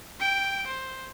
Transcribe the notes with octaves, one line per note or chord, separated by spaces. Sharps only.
G5 D7
C5